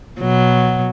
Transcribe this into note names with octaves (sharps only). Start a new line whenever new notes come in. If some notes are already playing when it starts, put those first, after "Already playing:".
B2 F#3